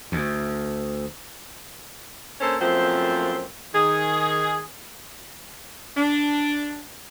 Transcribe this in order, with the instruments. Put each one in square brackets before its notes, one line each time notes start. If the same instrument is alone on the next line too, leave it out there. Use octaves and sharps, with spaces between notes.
[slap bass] D2
[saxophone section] A#3 C#4 D4 A4 C5
F#2 F3 A3 A#3 C4 C5
D#3 G#4
D4